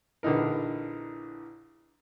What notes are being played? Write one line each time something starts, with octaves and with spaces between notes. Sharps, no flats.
A#1 D3 E3 D#4 A#4